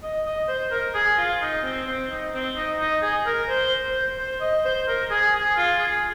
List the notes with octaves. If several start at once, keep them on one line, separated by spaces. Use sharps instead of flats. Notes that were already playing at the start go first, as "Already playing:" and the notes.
D#5
D#5
C5
A#4
G#4
F4
D#4
C4
C4
D#4
C4
D#4
D#4
G#4
A#4
C5
C5
C5
D#5
C5
A#4
G#4
G#4
F4
G#4